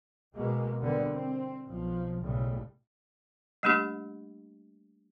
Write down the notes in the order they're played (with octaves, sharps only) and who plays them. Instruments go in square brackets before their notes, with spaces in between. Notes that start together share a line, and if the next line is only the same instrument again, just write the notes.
[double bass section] B2 G#3 A#3
D3 G3 A#3 B3
C4
B1 F3
B1 A2 C#3 G3
[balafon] G3 A3 A#3 D4 G4